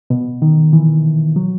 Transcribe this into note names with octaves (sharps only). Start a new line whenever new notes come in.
B2
D#3
E3
F#3